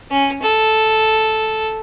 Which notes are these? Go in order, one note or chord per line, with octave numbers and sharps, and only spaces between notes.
C#4
A4